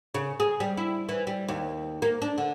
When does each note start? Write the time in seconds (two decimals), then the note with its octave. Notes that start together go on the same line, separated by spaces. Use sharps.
0.14 C#3
0.40 G#4
0.60 G3
0.77 E4
1.09 E3
1.27 G3
1.48 D#2
2.02 A#3
2.22 D4
2.38 D3